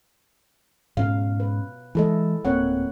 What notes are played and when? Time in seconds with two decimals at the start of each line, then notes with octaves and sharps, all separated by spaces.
0.97 G#2 B2 C#4 F5
1.40 B4
1.95 E3 G#3 E4 A4 D#5
2.45 D1 A#3 C4 C#5 F#5